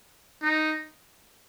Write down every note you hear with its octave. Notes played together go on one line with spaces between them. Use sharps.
D#4